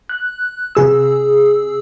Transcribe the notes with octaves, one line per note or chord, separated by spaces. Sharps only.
F#6
C3 G#4 E6